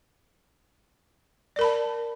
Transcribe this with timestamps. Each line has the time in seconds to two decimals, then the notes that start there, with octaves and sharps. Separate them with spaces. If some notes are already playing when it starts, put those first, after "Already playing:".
1.56 D5
1.59 A#4
1.61 B5
1.64 A5